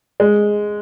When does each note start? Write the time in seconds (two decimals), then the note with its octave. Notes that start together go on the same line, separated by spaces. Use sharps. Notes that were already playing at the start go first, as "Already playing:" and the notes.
0.20 G#3